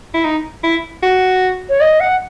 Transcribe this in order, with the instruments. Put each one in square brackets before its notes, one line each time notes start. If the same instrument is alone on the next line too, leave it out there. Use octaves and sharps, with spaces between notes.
[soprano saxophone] E4
D#4
E4
F#4
[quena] C#5
D#5
F#5